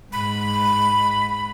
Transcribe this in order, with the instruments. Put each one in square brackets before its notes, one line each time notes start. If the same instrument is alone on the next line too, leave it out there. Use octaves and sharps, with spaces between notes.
[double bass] G#2 [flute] B5